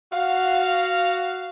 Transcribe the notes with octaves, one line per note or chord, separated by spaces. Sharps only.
F#4 F5